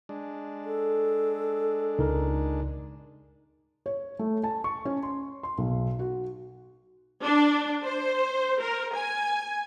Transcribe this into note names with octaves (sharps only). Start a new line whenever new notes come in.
G#3 D4
A4
C#2 D#4 A#4 A#5
C#5
A3
A5
C#6
C#4
C6
C6
B1
F#4
D4
C5
A#4
G#5